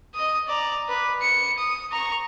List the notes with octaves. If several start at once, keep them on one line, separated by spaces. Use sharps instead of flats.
D#5 D#6
D5 A#5
B4
C#7
D#6
A#5 C#6